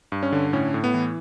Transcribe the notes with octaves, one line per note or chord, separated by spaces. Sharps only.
G2
C#4
D3
A2 C#4
A2
B3
E3